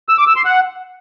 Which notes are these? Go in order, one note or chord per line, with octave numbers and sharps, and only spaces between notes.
E6
D6
E6
C6
F#5